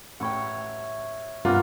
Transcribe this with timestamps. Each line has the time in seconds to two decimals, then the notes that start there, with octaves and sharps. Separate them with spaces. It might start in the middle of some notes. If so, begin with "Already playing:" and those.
0.20 A1 C#5 E5 F#5 G5
1.45 C2 G2 A#3 B3 F4 F#5 F6